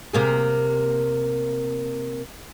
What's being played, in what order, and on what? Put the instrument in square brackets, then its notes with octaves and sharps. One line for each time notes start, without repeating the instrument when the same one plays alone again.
[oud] C3 A#3 G#4